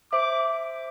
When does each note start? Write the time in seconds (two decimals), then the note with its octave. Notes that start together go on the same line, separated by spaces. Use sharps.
0.13 C5 E5 D6